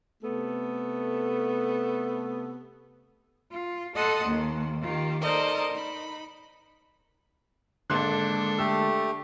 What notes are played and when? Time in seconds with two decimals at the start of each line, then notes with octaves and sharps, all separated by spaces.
0.23 C3 A3 B3 A4
3.51 F4
3.95 A4 D#5 F#5 A5 C6 D#6
4.24 D#2 D#3
4.80 D#3 F4 G4
5.21 D#4 A4 A#4 C5 D5 D#5
5.70 D#4 B5
7.90 G#1 D3 G#3 A#3 D4 A4 C6 F#6
8.59 A3 G4 E6